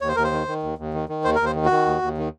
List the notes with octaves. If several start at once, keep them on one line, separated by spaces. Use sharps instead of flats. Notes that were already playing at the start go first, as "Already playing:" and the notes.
D#2 C#5
C5
D#2 A#4
C5
D#3
D#3
D#2
D#2
D#3
D#3
D#2 C5
D#2 A#4
C5
D#3
F#4
D#3
D#2
D#2
D#3